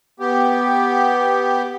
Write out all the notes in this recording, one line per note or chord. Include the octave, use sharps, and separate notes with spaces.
B3 G4